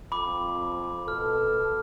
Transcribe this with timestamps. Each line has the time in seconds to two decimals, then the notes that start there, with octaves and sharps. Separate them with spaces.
0.12 F2 B5 D6
1.08 B2 A4 F6